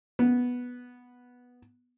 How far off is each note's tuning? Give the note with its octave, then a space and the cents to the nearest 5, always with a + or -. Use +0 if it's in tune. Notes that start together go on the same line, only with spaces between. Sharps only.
B3 -5